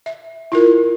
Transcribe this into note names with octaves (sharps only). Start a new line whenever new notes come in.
E5
E4 F4 A#4